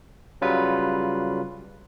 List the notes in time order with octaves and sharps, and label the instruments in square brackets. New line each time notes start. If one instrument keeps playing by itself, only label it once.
[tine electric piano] C#3 F#3 G3 F4 B4